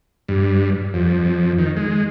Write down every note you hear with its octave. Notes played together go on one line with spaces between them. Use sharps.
G2
F2
D#3
G#3